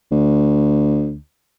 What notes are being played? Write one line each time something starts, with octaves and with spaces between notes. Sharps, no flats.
D2